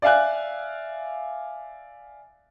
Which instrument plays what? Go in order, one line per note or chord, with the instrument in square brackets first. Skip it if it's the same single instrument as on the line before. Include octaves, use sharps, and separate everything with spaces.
[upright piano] D5 E5 F5 G#5 F#6